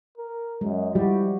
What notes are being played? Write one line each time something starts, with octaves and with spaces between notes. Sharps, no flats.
A#4
F#2 G#3
F3 G3 E4 F#4 G4